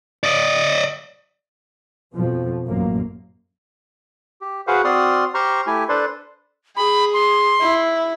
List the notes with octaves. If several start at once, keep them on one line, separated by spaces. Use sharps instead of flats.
D5 D#5
F2 B2 F3
A1 F#2 A#3
G4
F#4 G#4 B4 C5 F5 F#5
C4 F#4 D5 C6 D#6 F6
G4 C5 A#5 C6 C#6 F6
A3 E4 G4 G#5
D4 A4 B4 C5 D5 C6
G#4 B5
C6
E4